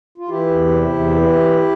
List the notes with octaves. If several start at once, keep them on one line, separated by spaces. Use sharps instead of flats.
F4
E3 E4 G4
E2
C3
E2
E3